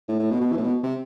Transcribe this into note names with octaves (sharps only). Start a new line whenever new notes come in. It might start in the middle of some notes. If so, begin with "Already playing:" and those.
A2
A2
B2
B2
E3
A2
B2
C3